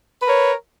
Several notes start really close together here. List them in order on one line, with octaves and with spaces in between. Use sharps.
B4 A#4 C#5